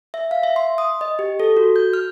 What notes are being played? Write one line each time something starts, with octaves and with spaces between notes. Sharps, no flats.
E5
F5
E5
C6
D#6
D#5
G4
A4
F#4
G6
F6